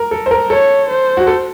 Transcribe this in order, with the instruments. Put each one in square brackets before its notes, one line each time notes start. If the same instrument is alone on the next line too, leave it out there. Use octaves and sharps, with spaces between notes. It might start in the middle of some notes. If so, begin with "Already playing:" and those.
Already playing: [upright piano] A#4
A4
C5
A#4
[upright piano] A4 [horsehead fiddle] C#5
[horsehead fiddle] C5
[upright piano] F#4
A4